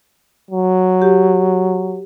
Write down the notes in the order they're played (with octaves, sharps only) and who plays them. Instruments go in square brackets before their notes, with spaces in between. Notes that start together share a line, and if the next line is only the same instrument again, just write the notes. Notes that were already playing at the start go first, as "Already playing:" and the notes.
[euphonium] F#3
[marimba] G4